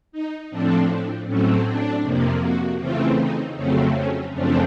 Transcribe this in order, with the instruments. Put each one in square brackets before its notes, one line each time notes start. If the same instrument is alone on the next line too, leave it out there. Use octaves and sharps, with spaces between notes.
[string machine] D#4
A2 F3 A3 C4 D4
A2 F#3 A3 C4 C#4
D4
F2 C3 F3 A#3
F#4
C#3 E3 A3 C4 F4
D#4
F2 C#3 F#3 A3 C4 C#4
C#4
F#2 C#3 F3 A3 C4 D4